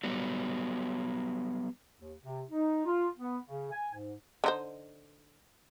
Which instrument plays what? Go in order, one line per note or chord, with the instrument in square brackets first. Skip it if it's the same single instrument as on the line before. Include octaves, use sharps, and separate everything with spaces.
[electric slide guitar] F#3 G3 B3
[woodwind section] D#2
C3
D#4
F4
B3
C#3
G#5
G#2
[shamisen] D3 D#4 C5